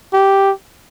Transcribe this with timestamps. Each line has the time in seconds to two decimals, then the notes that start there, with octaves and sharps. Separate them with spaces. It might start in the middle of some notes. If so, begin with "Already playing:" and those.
0.13 G4